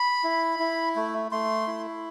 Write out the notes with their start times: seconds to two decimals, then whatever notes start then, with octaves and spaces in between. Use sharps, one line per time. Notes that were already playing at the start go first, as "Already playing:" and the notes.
Already playing: B5
0.24 E4
0.59 E4
0.96 A3
1.32 A3 C6
1.67 E4